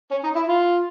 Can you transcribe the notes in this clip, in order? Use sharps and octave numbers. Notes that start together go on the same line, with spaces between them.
C#4
D#4
E4
F4